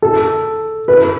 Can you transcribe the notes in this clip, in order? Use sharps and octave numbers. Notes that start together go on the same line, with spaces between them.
A4
B4